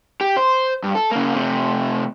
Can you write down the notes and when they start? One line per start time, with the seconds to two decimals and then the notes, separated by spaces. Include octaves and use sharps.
0.21 G4
0.37 C5
0.84 G2
0.95 A4
1.11 C#3 A#3
1.36 C3 A3